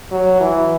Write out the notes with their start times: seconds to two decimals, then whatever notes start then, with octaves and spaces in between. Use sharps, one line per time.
0.12 F#3
0.41 E3